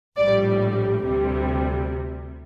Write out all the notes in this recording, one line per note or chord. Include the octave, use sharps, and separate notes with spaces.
A#1 A2 G3 D5
D2 C3 G3